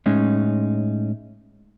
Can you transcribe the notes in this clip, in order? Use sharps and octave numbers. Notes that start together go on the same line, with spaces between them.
A2 G#3 C#4 D#4